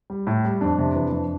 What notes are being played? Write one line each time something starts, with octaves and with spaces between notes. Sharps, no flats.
G3
A2
G3
F2 D4
C3
E3
F2